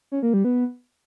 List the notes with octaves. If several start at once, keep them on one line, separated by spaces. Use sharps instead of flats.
C#4
A#3
G3
B3